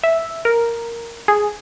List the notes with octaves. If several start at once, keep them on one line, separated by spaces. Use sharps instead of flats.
E5
A#4
G#4